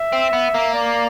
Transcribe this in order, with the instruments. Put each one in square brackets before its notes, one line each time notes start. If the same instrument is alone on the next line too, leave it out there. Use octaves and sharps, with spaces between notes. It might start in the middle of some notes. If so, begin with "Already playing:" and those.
Already playing: [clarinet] E5
[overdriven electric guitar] C4
B3
A#3
[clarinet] D5